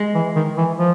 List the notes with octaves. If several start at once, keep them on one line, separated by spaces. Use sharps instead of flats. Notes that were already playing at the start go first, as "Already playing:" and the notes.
Already playing: G#3
E3
D#3
E3
F3